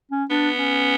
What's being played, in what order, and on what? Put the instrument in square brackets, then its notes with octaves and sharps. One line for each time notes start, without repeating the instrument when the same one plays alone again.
[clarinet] C#4
[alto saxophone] B3 [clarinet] D4
[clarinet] C#4